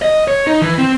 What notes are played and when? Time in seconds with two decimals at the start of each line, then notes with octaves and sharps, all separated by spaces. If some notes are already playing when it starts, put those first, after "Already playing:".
0.02 D#5
0.28 C#5
0.47 D#4
0.62 E3
0.78 C4